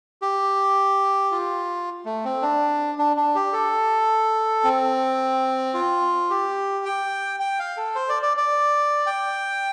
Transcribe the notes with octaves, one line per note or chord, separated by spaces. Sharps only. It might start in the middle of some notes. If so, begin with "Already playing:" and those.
G4
F4
A3
C4
D4
D4
D4
G4
A4
C4
F4
G4
G5
G5
F5
A4
C5
D5
D5
D5
G5